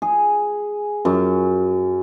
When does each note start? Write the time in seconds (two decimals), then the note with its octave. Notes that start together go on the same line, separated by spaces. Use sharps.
0.02 G#4
1.05 F#2